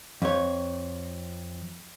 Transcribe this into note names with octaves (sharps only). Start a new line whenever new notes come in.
F2 C#5